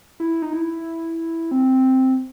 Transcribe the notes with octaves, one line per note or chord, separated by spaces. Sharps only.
E4
D#4
E4
C4